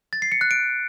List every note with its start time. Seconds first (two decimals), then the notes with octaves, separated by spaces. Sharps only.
0.13 A6
0.22 C7
0.32 C#7
0.41 F#6
0.51 D7